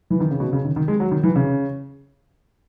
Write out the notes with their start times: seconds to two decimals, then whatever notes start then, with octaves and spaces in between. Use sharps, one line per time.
0.10 E3
0.20 D#3
0.31 C#3
0.40 B2
0.53 C#3
0.65 D#3
0.76 D#3
0.88 G#3
1.00 F#3
1.11 D#3
1.23 E3
1.36 C#3